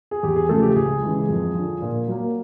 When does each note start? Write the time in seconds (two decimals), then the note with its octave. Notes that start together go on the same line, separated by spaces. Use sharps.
0.11 G#4
0.23 E2 G4
0.36 G#4
0.49 C#3 F3 A3 A4
0.62 G4
0.76 C#2 G#4
1.02 C#3 E3 G#3
1.29 F2
1.55 D3 F3
1.82 A#2
2.07 F#3 A#3